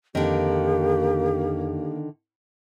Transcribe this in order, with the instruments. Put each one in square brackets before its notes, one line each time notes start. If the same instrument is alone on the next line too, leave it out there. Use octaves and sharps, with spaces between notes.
[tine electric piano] F2 [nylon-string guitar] D3 D#3 [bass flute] A#3 [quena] G4